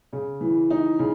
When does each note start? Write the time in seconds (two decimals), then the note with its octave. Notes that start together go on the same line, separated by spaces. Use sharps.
0.13 C#3
0.41 E3
0.70 D#4
0.99 C#3